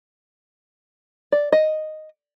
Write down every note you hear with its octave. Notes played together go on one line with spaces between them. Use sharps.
D5
D#5